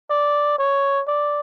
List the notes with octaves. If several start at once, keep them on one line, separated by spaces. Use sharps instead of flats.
D5
C#5
D5